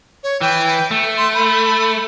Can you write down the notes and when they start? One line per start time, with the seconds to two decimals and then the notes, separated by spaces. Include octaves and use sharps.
0.24 C#5
0.41 E3 G5
0.91 A3
1.17 C6
1.35 B5